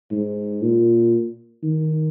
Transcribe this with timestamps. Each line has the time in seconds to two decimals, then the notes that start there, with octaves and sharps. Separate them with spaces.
0.11 G#2
0.62 A#2
1.63 D#3